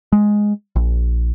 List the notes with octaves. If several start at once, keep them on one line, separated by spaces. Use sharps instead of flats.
G#3
A#1